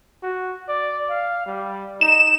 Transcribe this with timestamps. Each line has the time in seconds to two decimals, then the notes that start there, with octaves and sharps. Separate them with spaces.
0.23 F#4
0.68 D5
1.10 F5
1.46 G3
2.01 D#4 E7